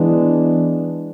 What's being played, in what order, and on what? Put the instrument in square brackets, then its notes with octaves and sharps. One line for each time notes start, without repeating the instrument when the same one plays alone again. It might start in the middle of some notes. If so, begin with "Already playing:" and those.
Already playing: [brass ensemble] E3 G#3 B3 D4